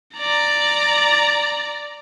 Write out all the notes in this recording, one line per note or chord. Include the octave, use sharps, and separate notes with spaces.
D5 A#5